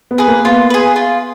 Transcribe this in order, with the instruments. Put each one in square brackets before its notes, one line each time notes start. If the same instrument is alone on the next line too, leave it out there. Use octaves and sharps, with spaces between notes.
[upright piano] B3
[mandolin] G#4 B4
[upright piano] A#3
[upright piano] B3 [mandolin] F4
[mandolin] G#4 B4
F4